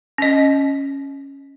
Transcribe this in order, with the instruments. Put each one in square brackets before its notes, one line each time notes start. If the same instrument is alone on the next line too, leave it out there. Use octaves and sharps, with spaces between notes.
[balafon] C#4 D#5